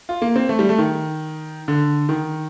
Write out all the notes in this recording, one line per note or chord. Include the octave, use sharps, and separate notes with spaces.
F4
A#3
C4
A3
G3
A3
D#3
D3
D#3